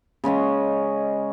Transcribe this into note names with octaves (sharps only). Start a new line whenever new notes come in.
C#3 G#3 C#4 D#5